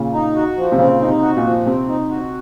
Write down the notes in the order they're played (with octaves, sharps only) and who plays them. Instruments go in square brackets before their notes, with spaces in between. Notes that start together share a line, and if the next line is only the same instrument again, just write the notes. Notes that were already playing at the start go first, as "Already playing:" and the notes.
Already playing: [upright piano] A#2 C#3
[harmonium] D#4
F#4
F3
[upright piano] C3
[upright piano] A#2 C#3 [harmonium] C4
[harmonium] D#4
[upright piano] C3
[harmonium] F#4
[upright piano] A#2
[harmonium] F3
[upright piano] C3 [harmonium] C4
[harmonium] D#4
F#4